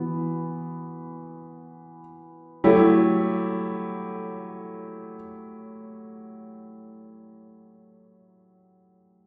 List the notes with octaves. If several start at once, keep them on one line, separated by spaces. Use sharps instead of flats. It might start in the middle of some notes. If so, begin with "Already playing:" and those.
Already playing: E3 B3 F#4
F#3 A3 E4 G4